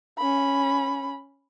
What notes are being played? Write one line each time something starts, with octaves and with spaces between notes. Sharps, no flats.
C#4 B5